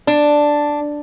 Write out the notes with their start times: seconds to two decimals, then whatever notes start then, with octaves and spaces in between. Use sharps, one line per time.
0.07 D4